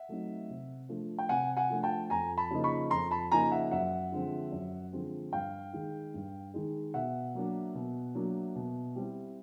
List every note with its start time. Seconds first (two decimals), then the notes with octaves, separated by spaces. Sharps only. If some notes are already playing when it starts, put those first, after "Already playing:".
Already playing: E5 F#5
0.09 F#3 A3 C4 D#4
0.49 C3
0.89 F3 A3 D4
1.19 G5
1.29 C3 F#5 G#5
1.57 F#5 G#5
1.70 F3 A3 D4
1.83 G5 A5
2.10 F2 G#5 A#5
2.37 A5 B5
2.51 C#3 F3 A#3 D#4
2.64 B5 C#6
2.90 F2 A#5 C6
3.11 A5 B5
3.31 C#3 F3 A#3 D#4 G#5 A#5
3.51 E5 F#5
3.71 F#2 E5 F#5
4.12 D3 F3 G#3 C4
4.52 F#2
4.93 D3 F3 G#3 C4
5.33 G2 F5 G5
5.73 D#3 G#3
6.14 G2
6.54 D#3 G#3
6.94 B2 E5 F#5
7.34 F#3 A#3 D4
7.75 B2
8.15 F#3 A#3 D4
8.56 B2
8.96 G3 C4 E4